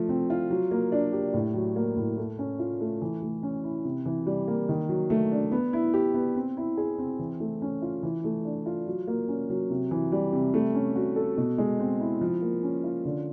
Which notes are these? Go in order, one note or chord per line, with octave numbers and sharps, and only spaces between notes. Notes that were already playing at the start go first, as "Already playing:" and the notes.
Already playing: F3 A3
C4
F4
F#3
A#3
D4
G4
A2
F#3
A#3
A2
A3
C#4
F4
A3
E3
A3
C#4
E4
C3
E3
G3
A#3
D#3
F#3
A3
D4
B3
E4
G4
B3
C4
E4
G#4
C4
E3
A3
C#4
F4
E3
A3
D4
F4
F#3
A#3
C#4
F#3
C3
E3
G3
C3
A3
C#4
F#4
A4
B2
G#3
C4
E4
F3
A#3
C#4
F4
D3